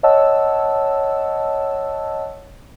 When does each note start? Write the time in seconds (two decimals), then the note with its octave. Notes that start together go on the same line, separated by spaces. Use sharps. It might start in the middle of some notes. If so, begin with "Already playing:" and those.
0.03 C#5 D#5 F#5 A5 E6